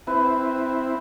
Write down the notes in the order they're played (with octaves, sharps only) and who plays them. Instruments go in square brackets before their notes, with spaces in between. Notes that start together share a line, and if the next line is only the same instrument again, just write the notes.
[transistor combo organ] C4 E4 [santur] B4